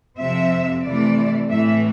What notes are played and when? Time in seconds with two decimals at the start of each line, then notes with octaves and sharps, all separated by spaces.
0.17 F2 C3 F3 C4 E5
0.83 C3 E3 A3 D5
1.49 A2 E3 A3 E5